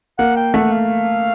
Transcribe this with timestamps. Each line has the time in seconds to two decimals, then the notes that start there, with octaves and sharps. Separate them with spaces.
0.19 A#3 F#5
0.36 G5
0.54 A3 F#5
0.72 F5